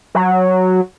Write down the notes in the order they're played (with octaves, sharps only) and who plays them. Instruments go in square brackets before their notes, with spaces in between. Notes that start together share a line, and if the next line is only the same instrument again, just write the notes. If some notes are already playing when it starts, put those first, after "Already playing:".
[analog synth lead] F#3